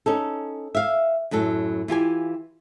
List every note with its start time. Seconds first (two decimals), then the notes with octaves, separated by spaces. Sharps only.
0.06 C#4 D#4 A4
0.75 E5 F5
1.31 F#2 A2 F#3 A4
1.88 E3 F4 G4 G#5